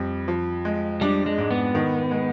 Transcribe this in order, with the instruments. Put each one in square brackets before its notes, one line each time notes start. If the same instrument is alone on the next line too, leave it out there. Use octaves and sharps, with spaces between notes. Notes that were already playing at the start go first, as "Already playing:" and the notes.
Already playing: [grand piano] F2 G3
F3
G#3
[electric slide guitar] G3 [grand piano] D4
[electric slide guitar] G#3
[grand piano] G#2
[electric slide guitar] B3
[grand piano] D#3
G#3